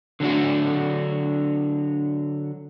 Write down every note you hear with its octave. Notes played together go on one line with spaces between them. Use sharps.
D3 F#3 D4 F#4